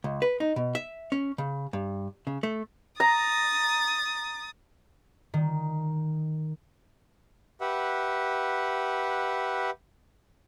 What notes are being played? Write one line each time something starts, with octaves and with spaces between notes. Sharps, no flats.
C#2
B4
D#4
B2
E5
C#4
C#3
G2
C#3
A3
A#5 D#6 A6
D#3
G4 B4 E5 F#5